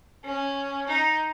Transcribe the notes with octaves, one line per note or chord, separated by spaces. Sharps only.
C#4
D#4